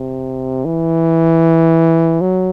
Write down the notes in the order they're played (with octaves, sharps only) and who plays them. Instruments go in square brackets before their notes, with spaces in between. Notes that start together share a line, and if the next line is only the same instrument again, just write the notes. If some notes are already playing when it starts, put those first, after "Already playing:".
Already playing: [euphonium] C3
E3
F#3